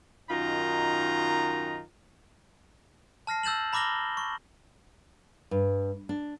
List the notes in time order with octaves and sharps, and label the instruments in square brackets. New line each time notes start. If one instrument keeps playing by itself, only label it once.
[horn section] F#2 D#3 D#4 F4 A#5
[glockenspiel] A5 F6 A#6 C7
E6 G6 A6 E7 F#7
A#5 B5 D6 F6 A#6 G7
C#6
[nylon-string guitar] G2
D4